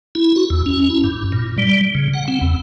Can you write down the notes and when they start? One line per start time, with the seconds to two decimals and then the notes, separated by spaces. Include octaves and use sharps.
0.15 E4
0.36 F#4
0.50 E2
0.66 C#4
0.90 E4
1.04 G2
1.32 A#2
1.58 G3
1.95 C#3
2.14 F#5
2.28 C4
2.41 E2